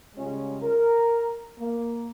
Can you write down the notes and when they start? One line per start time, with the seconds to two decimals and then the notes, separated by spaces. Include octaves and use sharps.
0.16 C#3 G3 G#3 C#4 F4
0.62 A#4
1.58 A#3